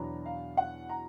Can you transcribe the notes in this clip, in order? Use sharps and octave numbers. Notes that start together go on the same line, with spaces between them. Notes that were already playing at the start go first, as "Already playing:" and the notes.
Already playing: E2 B2 F#3 B3 D4 A#5
F5
F#5
A#5